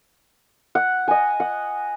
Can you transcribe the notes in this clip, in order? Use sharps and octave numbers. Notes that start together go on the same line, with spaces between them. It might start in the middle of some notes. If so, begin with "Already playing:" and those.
F#5
D#5 G#5
F#5